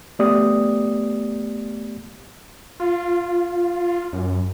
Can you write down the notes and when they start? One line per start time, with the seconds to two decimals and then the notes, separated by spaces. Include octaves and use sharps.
0.19 A3 B3 G4 D5 D#6
2.80 F4
4.13 F#2